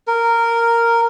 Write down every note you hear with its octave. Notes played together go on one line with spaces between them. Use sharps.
A#4